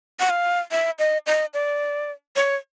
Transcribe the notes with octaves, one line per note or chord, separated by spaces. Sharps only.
F#5
F5
E5
D#5
D#5
D5
C#5